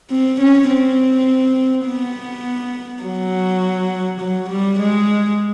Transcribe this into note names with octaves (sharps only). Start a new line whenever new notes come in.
C4
C#4
C4
B3
F#3
F#3
G3
G#3